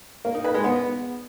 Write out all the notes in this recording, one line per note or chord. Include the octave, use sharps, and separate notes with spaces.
A#3
D#4
B4
G#3
B3